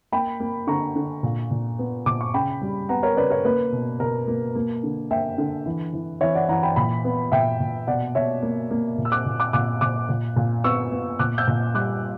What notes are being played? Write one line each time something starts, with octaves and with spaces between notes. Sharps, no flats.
A#3 G5 B5
A#3
D3 A#5 C#6
D3
A#2
A#2
B3
A#2 D6
C#6
C#3 G5 B5
G3
B3 F#5 A#5
A#4 C#5
C#3 B4 D5
A#4 C#5
A#3 B4
B2
B2 A#4
A#3
A#3
D3
A#3 E5 G5
D3
E3
E3
E3 C#5 E5
D5 F#5
E3 F#5 A#5
G5 B5
A#2 G5 B5
B3
A#2 E5 G5
A#2
B2 D5 F#5
B2 C#5 E5
A#3
A#3
A#2
E6
D6 F#6
A#2
D6 F#6
A#2 D6 F#6
A#2 D6 F#6
A#2
A#2
B3 C#6 E6
B3
A#2 D6 F#6
E6 G6
A#2
G3 D6 F#6